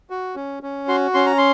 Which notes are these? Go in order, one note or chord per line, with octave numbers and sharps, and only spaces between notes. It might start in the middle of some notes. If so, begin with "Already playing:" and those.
F#4
C#4
C#4
F#4 C6
C#4 C6
A#5
C6